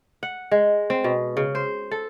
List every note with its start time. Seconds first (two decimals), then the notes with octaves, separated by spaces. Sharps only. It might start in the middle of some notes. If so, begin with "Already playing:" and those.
0.23 F#5
0.51 G#3
0.90 C4
1.04 B2
1.37 C#3
1.55 C5
1.91 A4